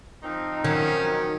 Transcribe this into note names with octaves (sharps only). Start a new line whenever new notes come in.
F3 C4 D#4
D#3 F#3 C#4